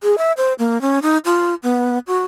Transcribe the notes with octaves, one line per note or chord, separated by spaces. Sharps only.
G#4
E5
C5
A#3
C#4
D#4
F4
B3
F#4